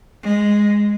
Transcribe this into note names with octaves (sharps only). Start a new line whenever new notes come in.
G#3